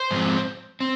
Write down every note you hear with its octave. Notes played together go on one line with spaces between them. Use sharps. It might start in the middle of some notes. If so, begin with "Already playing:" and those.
Already playing: C5
G#2 F3 G#3 C4
C4